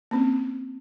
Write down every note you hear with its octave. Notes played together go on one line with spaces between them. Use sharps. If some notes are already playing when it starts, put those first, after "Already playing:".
A#3 C4 C#4